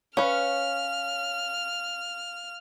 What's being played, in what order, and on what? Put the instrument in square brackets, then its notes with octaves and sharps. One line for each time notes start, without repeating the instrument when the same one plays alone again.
[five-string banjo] C#4 B4 [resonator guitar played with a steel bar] C#5 [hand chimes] F5 [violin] F6